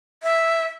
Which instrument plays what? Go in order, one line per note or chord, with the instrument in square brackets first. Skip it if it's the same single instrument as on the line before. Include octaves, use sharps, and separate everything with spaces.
[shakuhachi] E5